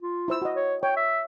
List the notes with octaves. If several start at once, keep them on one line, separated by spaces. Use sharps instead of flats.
F4
E4 C5 E6
F#4 D#5
C#5
C#5 G5
E5